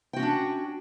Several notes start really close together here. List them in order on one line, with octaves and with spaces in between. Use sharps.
G5 F#4 C#4 D4